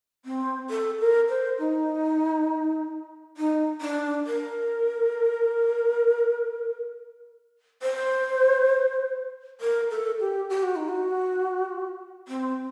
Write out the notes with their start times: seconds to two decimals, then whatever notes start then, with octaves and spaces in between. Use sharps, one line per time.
0.25 C4
0.70 A4
1.00 A#4
1.29 C5
1.59 D#4
3.37 D#4
3.81 D4
4.26 A#4
7.82 C5
9.61 A#4
9.90 A4
10.20 G4
10.50 G4
10.63 F#4
10.76 D#4
10.89 F#4
12.28 C4